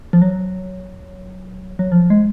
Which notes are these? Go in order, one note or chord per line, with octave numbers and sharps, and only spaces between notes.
F3
F#3
F#3
F3
G#3